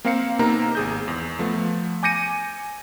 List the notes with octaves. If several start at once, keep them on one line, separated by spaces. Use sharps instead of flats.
A#3 C4 A#4 F5 C7 C#7
C3 A#3 B3 D#4 A#5
G#1 G#4 G6
E2
F3 A3 B3
G#5 D6 G6 A#6 C#7 D#7